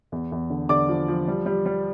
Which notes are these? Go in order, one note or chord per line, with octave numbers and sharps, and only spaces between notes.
E2
E2
D3
D3 D5 D6
F3
F3
G3
G3
G3